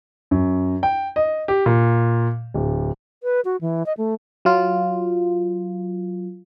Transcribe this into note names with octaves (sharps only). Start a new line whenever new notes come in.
F#2
G5
D#5
G4
A#2
D1
B4
F#4
E3
D#5
A3
F#3 F4